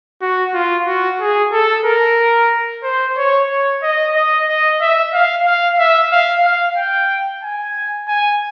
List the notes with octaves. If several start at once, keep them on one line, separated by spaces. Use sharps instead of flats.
F#4
F4
F#4
G#4
A4
A#4
C5
C#5
C#5
D#5
D#5
D#5
E5
F5
F5
E5
F5
F5
G5
G#5
G#5